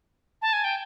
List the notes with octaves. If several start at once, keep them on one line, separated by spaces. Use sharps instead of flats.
A5
G#5
G5